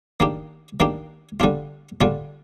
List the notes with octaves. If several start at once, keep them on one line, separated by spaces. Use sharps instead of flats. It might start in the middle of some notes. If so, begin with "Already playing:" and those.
D#3 A#3 D4 G4
D#3 A#3 D4 G4
D3 G3 D4 F4
D3 G3 D4 F4